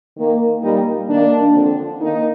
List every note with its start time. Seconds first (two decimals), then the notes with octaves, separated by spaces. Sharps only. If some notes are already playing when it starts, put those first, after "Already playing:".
0.17 D#3 A#3
0.62 A#2 G3 A#3 D#4
1.08 D#3 A#3 D4
1.54 D3 F3 C4
1.99 D#3 A#3 D#4